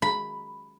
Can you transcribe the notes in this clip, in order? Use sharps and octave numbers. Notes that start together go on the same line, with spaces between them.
B5